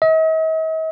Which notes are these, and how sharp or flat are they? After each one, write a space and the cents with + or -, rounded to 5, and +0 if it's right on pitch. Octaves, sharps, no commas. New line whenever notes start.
D#5 +45